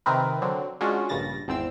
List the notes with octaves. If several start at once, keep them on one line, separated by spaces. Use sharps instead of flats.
C3 D#3 C4 A#4 B4
D3 F#3 C4
G#3 C#4 D4 F4 F#4
A#1 G2 C#3 A6 A#6
G#1 E2 C4 E6